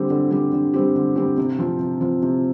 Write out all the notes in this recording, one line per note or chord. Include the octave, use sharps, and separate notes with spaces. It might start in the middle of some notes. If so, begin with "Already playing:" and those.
Already playing: D3 G3 C4 G4
D3
G3 C4 G4
D3
G3 C4 G4
D3
G3 C4 G4
C3
F3 C4 F4
C3
F3 C4 F4
C3